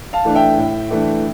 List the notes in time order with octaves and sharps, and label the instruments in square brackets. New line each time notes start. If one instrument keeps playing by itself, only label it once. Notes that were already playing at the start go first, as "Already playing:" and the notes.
[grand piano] F5 A5
E3 A3 D4
E5 G5
A2
E3 A3 D4